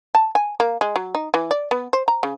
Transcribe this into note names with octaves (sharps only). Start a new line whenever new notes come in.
A5
G#5
A#3
G#3
F#3
D#4
E3
D5
B3
C5
A#5
C#3